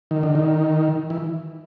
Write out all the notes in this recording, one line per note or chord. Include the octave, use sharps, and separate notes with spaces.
D#3
D3
D#3
E3